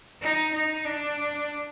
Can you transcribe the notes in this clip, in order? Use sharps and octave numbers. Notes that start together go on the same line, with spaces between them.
D#4
D#4
D4